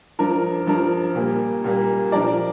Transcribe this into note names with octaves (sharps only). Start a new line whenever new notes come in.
G2 F3 D4 A#4
G2 F3 D4 A#4
A#2 G3 A#3
A#2 G3 A#3
F3 D4 A#4 D5